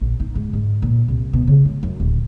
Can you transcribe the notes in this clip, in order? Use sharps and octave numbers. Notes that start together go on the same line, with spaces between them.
A#1
D#4
G#2
G#2
A#2
C2
B2
C#3
G#2
F#2
D1